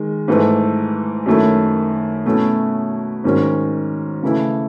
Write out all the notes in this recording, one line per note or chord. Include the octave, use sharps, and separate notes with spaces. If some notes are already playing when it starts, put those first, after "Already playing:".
Already playing: D#3 G#3
G#2 E3 A3
F#2 D#3 A3 E4
B2 F#3 A3 C#4 E4
G#2 D#3 F#3 C#4
C#3 E3 A3 E4